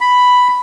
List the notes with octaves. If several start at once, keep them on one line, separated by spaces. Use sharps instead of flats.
B5